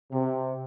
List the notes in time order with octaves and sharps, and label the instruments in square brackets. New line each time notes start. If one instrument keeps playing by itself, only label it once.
[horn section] C3